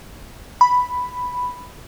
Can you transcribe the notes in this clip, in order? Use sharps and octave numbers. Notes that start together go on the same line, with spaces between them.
B5